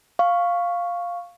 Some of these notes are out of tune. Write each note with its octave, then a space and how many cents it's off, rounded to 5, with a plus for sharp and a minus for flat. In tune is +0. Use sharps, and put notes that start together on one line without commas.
F5 +0 C#6 +0